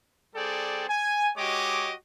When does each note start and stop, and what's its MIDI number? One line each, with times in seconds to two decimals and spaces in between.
0.34 0.88 55
0.34 0.88 60
0.34 0.88 68
0.34 0.88 69
0.34 0.88 74
0.34 0.88 79
0.89 1.29 80
1.36 1.93 56
1.36 1.93 66
1.36 1.93 67
1.36 1.93 73
1.36 1.93 75
1.36 1.93 86